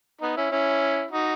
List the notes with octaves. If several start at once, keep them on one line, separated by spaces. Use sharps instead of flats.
B3 D#4
C#4 E4
C#4 E4
D#4 F#4